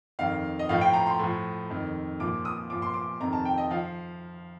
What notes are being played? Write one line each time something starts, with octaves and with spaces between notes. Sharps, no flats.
F2 D#3 F5
D#5
A2 F3 F5
G5
A#5
C6
A2 F3
F2 D#3
A#2 F3 D6
D#6
A#2 F3 D6
C6
D6
F2 C3 D#3 A#5
A5
G5
D#5
F3 F5